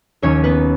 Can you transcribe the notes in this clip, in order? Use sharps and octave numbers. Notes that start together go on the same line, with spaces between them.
D#2 D#3 F#3 C#4 C#5
B3 B4